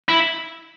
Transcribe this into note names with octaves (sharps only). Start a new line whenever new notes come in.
E4